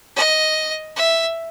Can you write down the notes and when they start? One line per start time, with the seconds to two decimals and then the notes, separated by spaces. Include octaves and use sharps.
0.16 D#5
0.96 E5